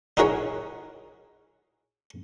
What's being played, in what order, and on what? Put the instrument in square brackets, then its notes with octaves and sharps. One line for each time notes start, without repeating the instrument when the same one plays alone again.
[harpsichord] D#4 E4 F#4 G#4 A#4 C#5